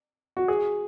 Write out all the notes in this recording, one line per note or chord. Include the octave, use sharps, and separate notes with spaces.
F#4
G#4